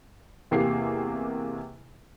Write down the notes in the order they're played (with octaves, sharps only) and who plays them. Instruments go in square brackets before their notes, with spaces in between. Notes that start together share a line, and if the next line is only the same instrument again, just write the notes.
[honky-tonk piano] E2 C3 A#3 G4 G#4 C7